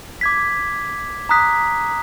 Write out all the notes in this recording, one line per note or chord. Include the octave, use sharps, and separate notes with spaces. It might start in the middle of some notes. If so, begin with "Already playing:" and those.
D6 G#6 B6
A#5 D#6 F#6 B6